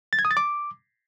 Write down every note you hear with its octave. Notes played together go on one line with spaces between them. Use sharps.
A6
G#6
D#6
A6
D6